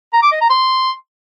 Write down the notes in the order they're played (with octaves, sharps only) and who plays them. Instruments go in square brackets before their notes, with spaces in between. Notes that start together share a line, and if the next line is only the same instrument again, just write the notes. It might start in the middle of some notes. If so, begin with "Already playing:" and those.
[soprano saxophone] A#5
D6
D#5
A#5
C6